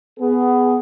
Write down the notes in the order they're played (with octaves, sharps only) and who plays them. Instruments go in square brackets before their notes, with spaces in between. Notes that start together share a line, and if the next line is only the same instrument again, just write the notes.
[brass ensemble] B3 G#4